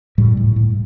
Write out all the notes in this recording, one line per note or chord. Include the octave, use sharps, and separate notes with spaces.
A2 G3
A2
A2